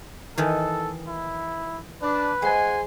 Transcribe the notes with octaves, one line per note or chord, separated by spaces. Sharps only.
D#3 E3 A4
E4
D4 B4
G#3 C5 F#5 G#5